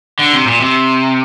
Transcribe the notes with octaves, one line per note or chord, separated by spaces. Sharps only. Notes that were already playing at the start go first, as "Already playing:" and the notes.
D3
C3
A#2
C3